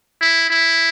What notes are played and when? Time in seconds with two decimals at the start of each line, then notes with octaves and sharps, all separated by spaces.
0.21 E4
0.50 E4